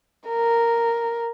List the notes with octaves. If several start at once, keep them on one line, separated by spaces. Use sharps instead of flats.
A#4